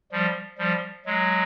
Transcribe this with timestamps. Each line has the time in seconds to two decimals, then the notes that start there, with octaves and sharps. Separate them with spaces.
0.12 F3 G3
0.58 F3 G3
1.06 F#3 G#3